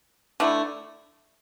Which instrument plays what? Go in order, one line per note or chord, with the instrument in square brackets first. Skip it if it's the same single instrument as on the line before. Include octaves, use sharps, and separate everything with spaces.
[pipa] D3 A3 E4